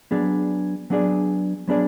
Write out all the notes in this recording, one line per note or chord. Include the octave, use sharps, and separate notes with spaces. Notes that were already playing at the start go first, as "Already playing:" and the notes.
F#3 B3 D4 G#4 D5
F#3 B3 D4 G#4 D5
F#3 B3 D4 G#4 D5